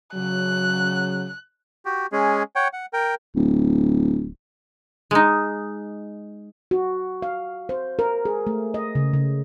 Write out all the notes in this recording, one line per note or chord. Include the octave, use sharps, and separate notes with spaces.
C#3 F#3 F#6
F#4 G4
G#3 C#4 G#4
C#5 F#5 G5
F#5
A#4 G5
D1
G#3 D#4
F#4
F5
C5
A#4
G#4
A3
D#5
C#3
C#3